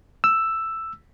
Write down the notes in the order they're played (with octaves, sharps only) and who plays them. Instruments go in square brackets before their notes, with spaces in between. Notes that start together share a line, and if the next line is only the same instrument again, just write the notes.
[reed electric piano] E6